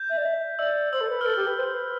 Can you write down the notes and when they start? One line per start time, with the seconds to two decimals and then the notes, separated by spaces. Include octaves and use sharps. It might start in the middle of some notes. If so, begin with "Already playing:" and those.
Already playing: G6
0.10 E5
0.17 D5
0.25 E5
0.59 D5 E6
0.93 C5 E6
1.01 A4
1.09 B4
1.21 F6
1.25 A4 E6
1.36 G4
1.47 B4
1.58 C5
1.74 B4